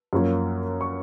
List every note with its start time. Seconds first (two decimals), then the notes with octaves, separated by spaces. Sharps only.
0.13 F#2 F3 A#3 C#4
0.81 C#6